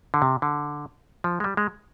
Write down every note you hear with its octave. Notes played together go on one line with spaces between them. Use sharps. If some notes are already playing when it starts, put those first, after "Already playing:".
D3
C3
D3
F3
G#3
G3
G#3